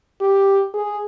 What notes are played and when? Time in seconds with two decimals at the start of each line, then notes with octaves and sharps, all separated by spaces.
0.21 G4
0.74 G#4